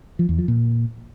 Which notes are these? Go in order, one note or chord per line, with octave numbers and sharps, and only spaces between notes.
F3
E2
F3
A#2